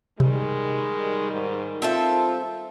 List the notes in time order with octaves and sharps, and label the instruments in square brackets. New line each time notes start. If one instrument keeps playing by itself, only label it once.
[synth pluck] C3 [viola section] D#3 G3 [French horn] G#3
[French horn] G#2
[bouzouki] C4 A4 E5 [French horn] F4